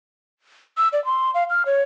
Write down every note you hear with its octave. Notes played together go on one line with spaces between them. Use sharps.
E6
D5
C6
F5
F6
C#5